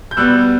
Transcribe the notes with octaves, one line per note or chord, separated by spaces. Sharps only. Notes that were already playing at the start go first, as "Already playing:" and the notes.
G6
B2 G3 B3 E6 F#6